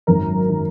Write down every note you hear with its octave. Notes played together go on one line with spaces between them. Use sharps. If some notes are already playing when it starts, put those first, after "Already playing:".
G#1 F#2 D#3 A#4
D#3